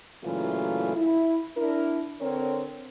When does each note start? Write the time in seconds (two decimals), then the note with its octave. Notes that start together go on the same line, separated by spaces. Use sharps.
0.23 A#2 C#3 E3 F#3 A3 F4
0.96 E4
1.56 D4 E4 A#4
2.21 D3 C4 A#4 C#5